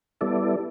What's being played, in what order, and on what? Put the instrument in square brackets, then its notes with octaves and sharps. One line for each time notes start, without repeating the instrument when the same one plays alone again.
[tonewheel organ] G3 B3 E4 A4 D5